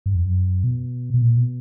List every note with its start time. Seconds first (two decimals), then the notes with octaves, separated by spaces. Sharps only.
0.06 G2
0.15 F2
0.25 F#2
0.64 B2
1.14 B2
1.22 A#2
1.37 B2